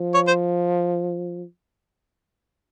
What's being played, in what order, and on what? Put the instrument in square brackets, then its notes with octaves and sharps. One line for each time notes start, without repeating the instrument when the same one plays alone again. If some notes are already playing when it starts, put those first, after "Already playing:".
Already playing: [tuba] F3
[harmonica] C#5
C5